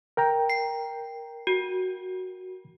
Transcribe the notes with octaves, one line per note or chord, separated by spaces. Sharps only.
A#4 G5 A#5
C7
F#4